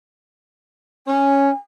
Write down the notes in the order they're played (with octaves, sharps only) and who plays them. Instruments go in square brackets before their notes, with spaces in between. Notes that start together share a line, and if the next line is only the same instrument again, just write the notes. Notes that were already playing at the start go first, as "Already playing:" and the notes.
[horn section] C#4 [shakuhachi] G#5